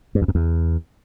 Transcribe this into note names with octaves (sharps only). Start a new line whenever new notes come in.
G2
E2
F#2
E2